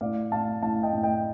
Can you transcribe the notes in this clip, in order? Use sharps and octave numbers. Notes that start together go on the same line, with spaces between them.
A2 D5 F5
A2 F5 A5
A2 F5 A5
D#5 G5
A2
D#5 G5